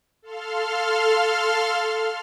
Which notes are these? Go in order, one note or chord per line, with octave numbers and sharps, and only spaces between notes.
A4 F5 C6 F6